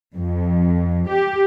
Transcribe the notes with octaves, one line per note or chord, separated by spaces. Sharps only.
F2
G4